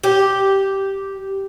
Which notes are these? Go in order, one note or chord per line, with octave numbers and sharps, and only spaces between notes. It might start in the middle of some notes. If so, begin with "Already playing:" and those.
G4